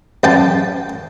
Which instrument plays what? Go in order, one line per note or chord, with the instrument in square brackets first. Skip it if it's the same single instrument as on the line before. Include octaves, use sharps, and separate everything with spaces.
[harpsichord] F#2 G5 A5